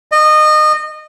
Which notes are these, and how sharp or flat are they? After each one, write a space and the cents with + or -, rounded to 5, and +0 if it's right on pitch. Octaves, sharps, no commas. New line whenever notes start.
D#5 -25